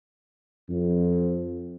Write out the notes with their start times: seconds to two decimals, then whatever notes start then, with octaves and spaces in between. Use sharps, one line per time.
0.69 F2